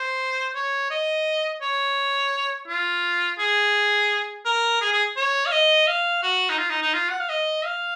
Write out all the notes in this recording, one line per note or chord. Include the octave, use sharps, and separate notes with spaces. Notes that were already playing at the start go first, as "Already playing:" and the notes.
Already playing: C5
C#5
D#5
C#5
F4
G#4
A#4
G#4
G#4
C#5
F5
D#5
F5
F#4
D#4
F4
D#4
D#4
F4
F#5
F5
D#5
F5